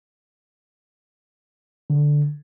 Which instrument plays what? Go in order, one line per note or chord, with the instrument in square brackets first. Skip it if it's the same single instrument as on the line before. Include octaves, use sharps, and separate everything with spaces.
[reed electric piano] D3